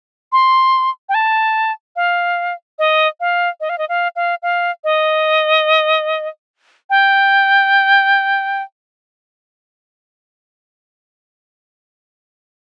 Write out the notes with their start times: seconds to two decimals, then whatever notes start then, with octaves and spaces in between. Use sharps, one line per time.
0.33 C6
1.09 G5
1.14 A5
1.96 F5
2.79 D#5
3.20 F5
3.61 D#5
3.69 F5
3.78 D#5
3.89 F5
4.16 F5
4.43 F5
4.84 D#5
6.90 G5